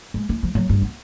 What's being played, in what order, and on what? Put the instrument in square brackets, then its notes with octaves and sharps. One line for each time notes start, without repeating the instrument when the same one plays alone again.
[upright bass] G#3
E4
F3
F#3
G2
B3